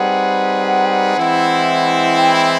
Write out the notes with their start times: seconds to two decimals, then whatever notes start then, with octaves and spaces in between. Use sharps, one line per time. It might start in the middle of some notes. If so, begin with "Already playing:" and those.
Already playing: G3 C4 D#4 G#4 B4 F#5
0.66 F#5
0.85 G5
0.91 F#5
1.17 E3 G#3 C4 E4
2.18 G5
2.35 G5